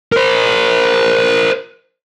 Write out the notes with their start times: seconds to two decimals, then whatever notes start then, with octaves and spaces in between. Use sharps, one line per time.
0.12 A#4 C5